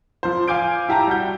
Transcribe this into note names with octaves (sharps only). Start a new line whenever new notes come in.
F3 C5
F5 G#5 D6 G6 D7
E4 G4 A5 A#5
G3 F#4 G6